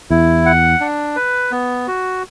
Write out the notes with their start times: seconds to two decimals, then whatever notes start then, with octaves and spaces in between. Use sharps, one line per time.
0.10 E2 E4
0.46 F#5
0.81 D4
1.16 B4
1.52 B3
1.88 F#4